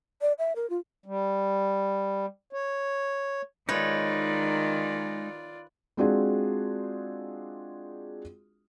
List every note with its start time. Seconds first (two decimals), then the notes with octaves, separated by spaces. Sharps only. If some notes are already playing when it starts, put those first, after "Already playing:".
0.21 D5
0.39 E5
0.56 A#4
0.70 F4
1.06 G3
2.53 C#5
3.69 D#3 G#3 D#4 F4 B4 C#5 D5
5.97 G#3 C4 D4 F4 F#4 G#4